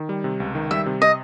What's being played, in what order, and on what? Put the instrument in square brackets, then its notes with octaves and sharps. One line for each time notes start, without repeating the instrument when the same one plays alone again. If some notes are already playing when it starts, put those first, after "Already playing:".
Already playing: [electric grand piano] D#3
G3
C3
C#2
D#3
[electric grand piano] G3 [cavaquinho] E5
[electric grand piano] C3
[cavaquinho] D#5